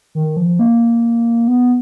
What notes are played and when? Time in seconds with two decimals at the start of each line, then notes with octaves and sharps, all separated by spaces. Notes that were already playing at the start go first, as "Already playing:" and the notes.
0.15 D#3
0.37 F3
0.59 A#3
1.48 B3